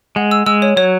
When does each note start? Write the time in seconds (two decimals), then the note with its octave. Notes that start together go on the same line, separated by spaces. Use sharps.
0.16 G#3 F#5
0.31 E6
0.46 G#3 E6
0.62 C#5
0.77 F#3 C#5